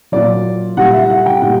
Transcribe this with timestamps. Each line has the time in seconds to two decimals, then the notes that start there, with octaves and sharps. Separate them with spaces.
0.12 A#2 F#3 D5
0.77 A#2 G3 F#5
0.93 E5
1.05 E5
1.10 F#5
1.26 G5
1.42 A#2 G3 F#5